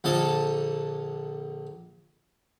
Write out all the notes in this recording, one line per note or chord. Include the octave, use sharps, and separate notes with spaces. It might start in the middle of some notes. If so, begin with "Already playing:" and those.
A#1 A#2 D3 A4 D#5 A5